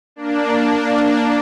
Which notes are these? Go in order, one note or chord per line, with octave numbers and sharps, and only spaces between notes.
A#3 D4